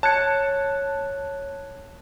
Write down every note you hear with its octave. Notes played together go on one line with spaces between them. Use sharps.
C#5 A5 F#6 G#6 C#7